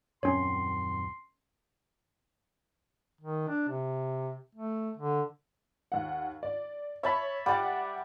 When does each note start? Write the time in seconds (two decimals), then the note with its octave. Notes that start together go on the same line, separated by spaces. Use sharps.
0.23 D#1 F#2 C4 C#4 C#5 C6
3.21 D#3
3.48 D4
3.69 C3
4.55 A3
4.97 D3
5.92 D#2 F#5
6.43 D5
7.03 C#5 E5 A5 B5
7.46 G3 D5 F#5 D6